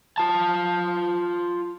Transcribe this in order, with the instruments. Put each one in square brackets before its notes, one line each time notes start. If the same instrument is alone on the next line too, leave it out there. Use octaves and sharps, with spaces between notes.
[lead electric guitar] F4 A5